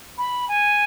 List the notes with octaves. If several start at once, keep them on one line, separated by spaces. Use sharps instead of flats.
B5
G#5